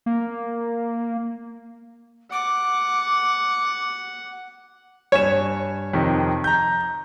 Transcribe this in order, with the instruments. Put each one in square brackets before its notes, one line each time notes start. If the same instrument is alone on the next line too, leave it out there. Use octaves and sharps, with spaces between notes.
[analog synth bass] A#3
[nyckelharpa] F#5 [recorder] D6
[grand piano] G2 G#5 E7 [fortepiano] C#5
[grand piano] F2 C3 D#3
A#5 G6